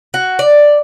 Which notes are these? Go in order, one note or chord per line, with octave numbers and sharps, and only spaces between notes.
F#4
D5